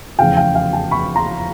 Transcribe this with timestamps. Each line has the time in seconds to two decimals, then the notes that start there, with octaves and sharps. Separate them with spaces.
0.19 F1 E2 C#3 F5 G5
0.37 F5 G5
0.55 F5 G5
0.73 G5 A5
0.91 B5 C#6
1.16 A#5 C6